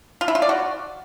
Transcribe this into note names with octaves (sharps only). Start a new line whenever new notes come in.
F4
E4
F4
D5
F#4